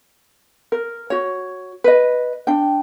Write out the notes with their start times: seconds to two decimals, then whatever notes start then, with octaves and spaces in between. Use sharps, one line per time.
0.72 A#4
1.10 F#4 C#5
1.84 B4 D#5
2.47 D4 G5